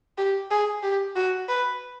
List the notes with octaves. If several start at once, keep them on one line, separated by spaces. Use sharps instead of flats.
G4
G#4
G4
F#4
B4